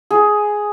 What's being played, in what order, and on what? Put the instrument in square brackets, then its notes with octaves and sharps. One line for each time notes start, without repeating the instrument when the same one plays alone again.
[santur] G#4